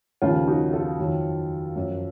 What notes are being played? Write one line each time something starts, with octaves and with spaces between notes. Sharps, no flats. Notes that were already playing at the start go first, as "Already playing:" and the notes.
D#2 C#3 F3 C#4 F4
D#4 F#4
F4 A4
F2 D#3 F#3
F#2 F3